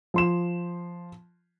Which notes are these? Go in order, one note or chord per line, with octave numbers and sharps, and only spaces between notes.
F3 C6 E7